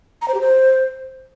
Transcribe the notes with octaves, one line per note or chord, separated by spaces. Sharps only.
A#5
C5
G4
C5